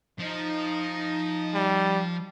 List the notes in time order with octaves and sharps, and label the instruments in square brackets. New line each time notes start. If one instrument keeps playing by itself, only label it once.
[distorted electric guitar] F3 [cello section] D#4
[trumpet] G3